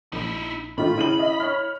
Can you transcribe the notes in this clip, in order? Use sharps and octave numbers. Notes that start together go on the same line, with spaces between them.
A#1 D#4 E4
A2 D#3 A3 F4 B5
C#3 E4 D#7 F#7
D#5 E5
C#5 F6